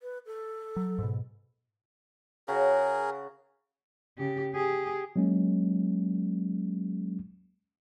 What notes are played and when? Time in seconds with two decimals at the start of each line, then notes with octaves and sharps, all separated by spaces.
0.01 B4
0.26 A4
0.76 F#3
0.99 G#2 B2
2.48 C#3 F#4 G#4 A#4
4.18 C#3 G4
4.53 G4 G#4
5.16 F#3 G#3 A#3 C#4